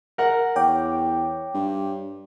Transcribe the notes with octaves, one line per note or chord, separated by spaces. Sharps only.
A#4 F#5
E2 C#5 G5 D6
G2